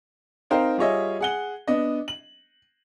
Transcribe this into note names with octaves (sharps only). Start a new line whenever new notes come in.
C4 D#4 A#4 C5 F5 G5
G3 F4 G#4 C#5 D#5 E5
G#4 F#5 G7
B3 D4 D#5
F#7